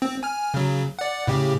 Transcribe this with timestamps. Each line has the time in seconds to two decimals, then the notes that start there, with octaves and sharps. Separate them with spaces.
0.02 C4
0.23 G#5 F6
0.54 C#3 F#3
0.99 D5 F#5
1.27 A2 C#3 G4